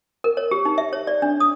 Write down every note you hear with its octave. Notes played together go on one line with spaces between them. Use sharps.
A#4
C#5
G4
D#4
E5
C#5
D5
D4
D#6